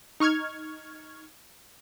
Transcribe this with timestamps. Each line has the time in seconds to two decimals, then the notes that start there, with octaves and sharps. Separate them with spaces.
0.20 D#4 C#6 F6 G#6